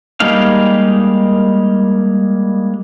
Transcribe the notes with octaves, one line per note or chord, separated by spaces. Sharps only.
G3 G#3 A#3 D#4 F5